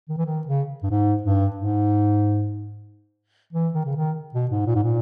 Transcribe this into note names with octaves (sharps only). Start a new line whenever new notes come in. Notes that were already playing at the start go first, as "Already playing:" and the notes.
D#3
E3
D#3
C#3
G2
G#2
G2
G#2
E3
D#3
C#3
D#3
B2
G#2
A#2
G#2
A#2